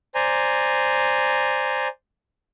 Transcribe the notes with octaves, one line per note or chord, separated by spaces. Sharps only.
C5 D5 G#5 A#5